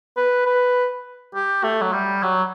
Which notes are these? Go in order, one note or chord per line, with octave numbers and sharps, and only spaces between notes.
B4
B4
G4
A3
F#3
G3
F#3